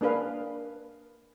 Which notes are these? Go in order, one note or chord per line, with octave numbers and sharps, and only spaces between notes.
A#3 D4 G#4 B4 F5